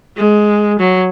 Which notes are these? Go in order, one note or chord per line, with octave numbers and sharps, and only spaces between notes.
G#3
F#3